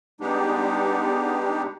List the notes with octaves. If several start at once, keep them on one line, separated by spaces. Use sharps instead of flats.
G3 G#3 B3 D4 D#4 G4